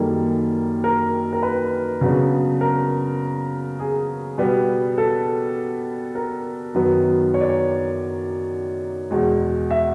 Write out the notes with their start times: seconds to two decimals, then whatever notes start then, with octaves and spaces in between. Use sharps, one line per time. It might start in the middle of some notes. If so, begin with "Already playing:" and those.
Already playing: F#2 D#3 G3 A#3 A4
0.84 A#4
1.33 A#4
1.43 B4
2.01 C#3 F#3 B3 D4
2.61 A#4
3.80 G#4
4.38 B2 G3 B3
4.98 A4
6.15 A#4
6.74 F#2 D#3 F#3 B3
7.34 C#5
7.41 D5
7.49 C#5
9.11 E2 B2 G#3
9.71 E5